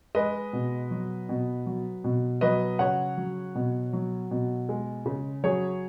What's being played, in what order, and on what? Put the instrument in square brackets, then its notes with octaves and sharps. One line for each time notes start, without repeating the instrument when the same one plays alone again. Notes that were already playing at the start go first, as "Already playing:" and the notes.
[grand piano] G#3 B4 D#5
B2
F#3
B2
F#3
B2
F#3 B4 D#5
C#3 C#5 F#5
F#3
B2
F#3
B2
G#3
C#3
F#3 G#4 C#5